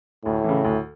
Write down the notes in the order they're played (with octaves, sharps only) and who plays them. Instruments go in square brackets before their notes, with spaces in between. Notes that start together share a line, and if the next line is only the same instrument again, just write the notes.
[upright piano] D2 [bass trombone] A2
[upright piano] C#3 E3
D2